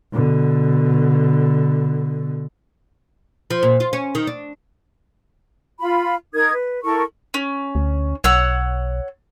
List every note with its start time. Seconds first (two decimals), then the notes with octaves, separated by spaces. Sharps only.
0.13 B2 D3
3.50 F3
3.63 A#2
3.80 F4
3.93 C#4
4.15 D#3
4.27 D4
5.80 F4 B5
6.34 D#4 A#4 D#6 G#6
6.52 B4
6.83 E4 A4 A#4 C#6
7.34 C#4
7.75 D2
8.24 B1 C#5 F#5 E6